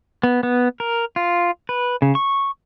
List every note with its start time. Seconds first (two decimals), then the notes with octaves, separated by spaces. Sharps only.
0.23 B3
0.43 B3
0.80 A#4
1.16 F4
1.69 B4
2.02 C#3
2.15 C#6